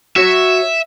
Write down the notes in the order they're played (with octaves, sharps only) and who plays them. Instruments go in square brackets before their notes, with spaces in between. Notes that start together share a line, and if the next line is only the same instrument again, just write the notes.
[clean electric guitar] F#4 C#5 [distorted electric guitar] E5